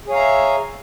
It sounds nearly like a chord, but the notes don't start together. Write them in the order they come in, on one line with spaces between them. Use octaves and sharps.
G#4 C#5 F5 A#5 E5